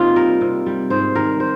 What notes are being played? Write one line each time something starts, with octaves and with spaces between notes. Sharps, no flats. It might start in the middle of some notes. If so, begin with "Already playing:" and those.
Already playing: C3 A#3 D#4 F4
G3 A#4
C3
G3
G#2 C5
D#3 G3 A#4
C5